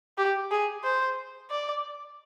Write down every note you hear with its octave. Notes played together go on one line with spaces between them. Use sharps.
G4
G#4
C5
D5